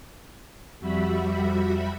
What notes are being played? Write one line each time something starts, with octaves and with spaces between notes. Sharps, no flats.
F2 G3 F#4 E5 B5